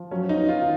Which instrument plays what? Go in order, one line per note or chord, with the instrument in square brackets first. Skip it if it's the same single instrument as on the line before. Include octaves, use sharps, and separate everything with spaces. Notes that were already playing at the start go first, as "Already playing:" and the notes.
Already playing: [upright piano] F3
[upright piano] F#3 [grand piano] C#4
[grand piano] D#4
[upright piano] B3
[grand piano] F4
[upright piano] D#3